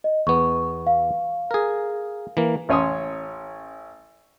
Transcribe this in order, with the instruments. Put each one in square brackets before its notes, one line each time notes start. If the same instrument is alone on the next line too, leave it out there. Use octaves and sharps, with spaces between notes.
[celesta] D#5
[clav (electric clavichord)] E2 B3 [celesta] C#6
[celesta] F5
[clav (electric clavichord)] G#4 A#4
E3 A#3
[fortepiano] A1 C#4 C#5 G#5 C6 D#6